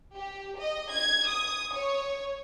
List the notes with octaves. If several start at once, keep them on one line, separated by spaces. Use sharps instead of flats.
G4
D#5
G#6
D#6
C#5